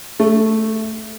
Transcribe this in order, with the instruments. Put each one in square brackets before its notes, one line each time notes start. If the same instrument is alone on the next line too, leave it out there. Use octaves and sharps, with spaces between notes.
[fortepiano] A3